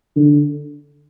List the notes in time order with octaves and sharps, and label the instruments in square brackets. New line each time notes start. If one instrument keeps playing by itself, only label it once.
[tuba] D3